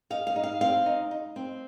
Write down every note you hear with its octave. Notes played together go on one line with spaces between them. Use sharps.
D#4 F5
F5
D#4
F5
C4 F5
D#4
D#4
C4